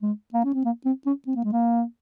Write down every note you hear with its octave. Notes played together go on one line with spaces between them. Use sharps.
G#3
A#3
C#4
C4
A#3
C4
C#4
C4
A#3
G#3
A#3